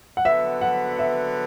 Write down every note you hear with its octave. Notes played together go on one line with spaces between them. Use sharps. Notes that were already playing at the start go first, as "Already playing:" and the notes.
F#5
D3 F#3 B3 E5
F#5
E5